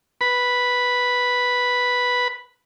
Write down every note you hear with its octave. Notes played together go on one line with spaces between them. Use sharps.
B4 B5